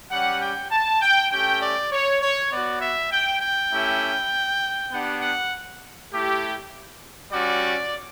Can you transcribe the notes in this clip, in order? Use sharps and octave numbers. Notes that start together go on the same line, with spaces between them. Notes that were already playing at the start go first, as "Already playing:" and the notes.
G3 C#4 G4 F#5
G5
A5
G5
A3 C#4 G4 G5
D5
C#5
C#5
B3 F#4 D5
E5
G5
G5
A3 C#4 E4 G4
B3 D4 G4 F#5
F#5
A3 E4 G4
G3 C#4 F#4 D5